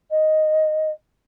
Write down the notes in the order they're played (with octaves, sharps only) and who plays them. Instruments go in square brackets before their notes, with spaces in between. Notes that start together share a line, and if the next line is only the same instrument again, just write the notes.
[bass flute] D#5